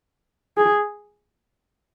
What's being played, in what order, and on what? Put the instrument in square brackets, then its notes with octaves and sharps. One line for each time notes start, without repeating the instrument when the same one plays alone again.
[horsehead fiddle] G#4